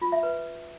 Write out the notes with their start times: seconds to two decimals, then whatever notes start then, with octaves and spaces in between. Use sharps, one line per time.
0.01 F4
0.12 E5
0.23 B4